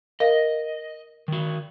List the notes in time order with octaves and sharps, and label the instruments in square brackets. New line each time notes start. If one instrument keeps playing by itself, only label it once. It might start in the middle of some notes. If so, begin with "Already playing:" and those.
[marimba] A#4 F5 [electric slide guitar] D#5
[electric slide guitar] D#3 F#4